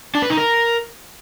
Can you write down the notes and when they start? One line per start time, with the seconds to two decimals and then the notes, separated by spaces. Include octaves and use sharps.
0.15 D4
0.22 B4
0.30 D#4
0.38 A#4